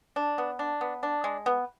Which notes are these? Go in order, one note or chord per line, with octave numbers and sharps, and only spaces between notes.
D4
B3
D4
B3
D4
G#3
B3